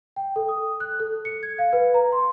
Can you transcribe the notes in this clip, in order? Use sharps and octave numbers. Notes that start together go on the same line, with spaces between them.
G5
A4
D#6
F#6
A4
C#7
G#6
F5
B4
A#5
C6